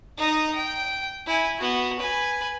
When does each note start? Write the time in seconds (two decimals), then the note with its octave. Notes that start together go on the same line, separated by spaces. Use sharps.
0.18 D#4 D#5
0.55 G5
1.26 E4 G#5
1.58 B3 F#4
1.99 B4 G#5